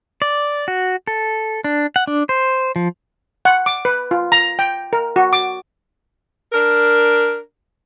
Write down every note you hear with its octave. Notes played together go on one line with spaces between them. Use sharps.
D5
F#4
A4
D4
F#5
D4
C5
F3
F#5
D6
B4
F4
A#5
G5
A#4
F#4
D6
D4 A#4